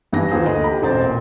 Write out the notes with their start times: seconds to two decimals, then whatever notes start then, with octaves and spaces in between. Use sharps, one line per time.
0.13 G#1 G2 E3 G3 G#5 A#6
0.30 D#2 E3 F4 G#4 C5
0.46 D2 D#5
0.64 G4 A#5 B5
0.82 E1 A1 C4 A#4 C5 A6
1.04 A#2